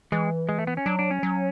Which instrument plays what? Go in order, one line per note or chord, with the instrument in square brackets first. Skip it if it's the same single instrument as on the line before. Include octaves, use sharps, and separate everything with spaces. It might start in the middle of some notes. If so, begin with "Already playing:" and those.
[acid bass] E3 [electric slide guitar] G#3
[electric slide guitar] G#3
A3
B3
C#4
[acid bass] F#3 [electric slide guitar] D4
[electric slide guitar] D4
C#4
[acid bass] F#3